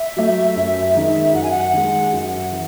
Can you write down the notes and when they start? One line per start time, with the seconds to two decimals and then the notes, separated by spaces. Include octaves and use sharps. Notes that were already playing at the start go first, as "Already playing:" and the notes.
Already playing: E5
0.17 F#3 A3
0.56 F#2
0.95 D#3 G#3 D#4
1.33 F#2 F#5
1.43 G#5
1.51 F#5
1.74 D#3 G#3
2.13 F#2
2.52 E3